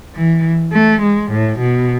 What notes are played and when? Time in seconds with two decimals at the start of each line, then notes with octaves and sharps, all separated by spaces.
0.15 E3
0.73 A3
1.02 G#3
1.32 A2
1.59 B2